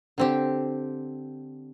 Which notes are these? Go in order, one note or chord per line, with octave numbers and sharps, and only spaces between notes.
D3 C4 G4